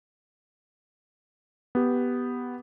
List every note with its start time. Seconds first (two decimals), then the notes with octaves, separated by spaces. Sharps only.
1.75 B3 G4